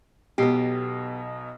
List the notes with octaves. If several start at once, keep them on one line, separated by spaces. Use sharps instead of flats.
B1 B2 B3 G4 C7